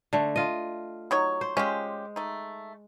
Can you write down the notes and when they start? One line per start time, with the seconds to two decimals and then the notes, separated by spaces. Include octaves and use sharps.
0.13 D3 A3
0.36 F4 D#5
1.11 F#3 D#4 C#5
1.41 C5
1.57 G#3 C#4 F4 G4
2.16 A3 D#4